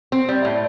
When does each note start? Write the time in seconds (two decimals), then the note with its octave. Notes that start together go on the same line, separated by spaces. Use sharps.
0.12 C4
0.29 G3
0.45 A2